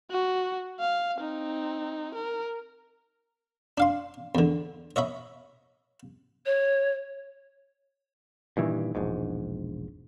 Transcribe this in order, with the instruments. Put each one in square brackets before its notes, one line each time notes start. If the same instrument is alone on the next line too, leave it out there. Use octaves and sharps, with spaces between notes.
[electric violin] F#4
F5
C4 D#4
A#4
[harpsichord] D4 F5 C6
E2 D3
C#5 D#5 E5 B5
[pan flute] C#5
[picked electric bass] G2 A#2 D#3 E3
E1 A#1 G#2